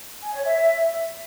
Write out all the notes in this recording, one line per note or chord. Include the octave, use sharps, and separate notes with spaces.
G#5
C#5
E5